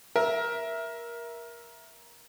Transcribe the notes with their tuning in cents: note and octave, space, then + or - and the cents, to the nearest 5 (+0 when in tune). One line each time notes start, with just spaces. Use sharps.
A#4 +15 E5 +0